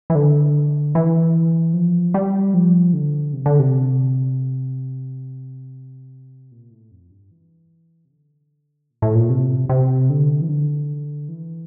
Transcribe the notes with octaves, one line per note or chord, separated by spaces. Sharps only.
E3
D3
E3
F3
G3
F3
D3
C3
D3
C3
A#2
A2
F2
G2
E3
C3
D3
A#2
A2
A#2
C3
C3
D3
E3
D3
E3